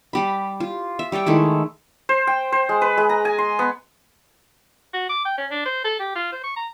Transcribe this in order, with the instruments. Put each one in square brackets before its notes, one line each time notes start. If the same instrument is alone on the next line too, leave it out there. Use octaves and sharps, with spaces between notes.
[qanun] G3 G4 B5
F4
E5
G3 C#5 D5 G5
D#3 G#3 A3 E4
[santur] C5
G5
C5
G#3
B4
G#3
A#5
G#5
C6
B3
[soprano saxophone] F#4
D6
G5
C#4
D4
C5
A4
G4
F4
C5
C#6
A#5